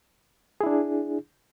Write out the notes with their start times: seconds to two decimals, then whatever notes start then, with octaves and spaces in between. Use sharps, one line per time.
0.61 G#4
0.63 E4
0.66 D4